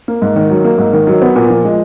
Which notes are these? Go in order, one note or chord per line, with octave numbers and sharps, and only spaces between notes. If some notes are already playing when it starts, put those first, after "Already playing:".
A#3
G#2
D#3
F#3
A#3
G#2
D#3
F#3
B3
A#2
F3
G#3